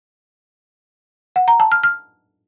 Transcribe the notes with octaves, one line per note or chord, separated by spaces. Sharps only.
F#5
A#5
A5
F6
F6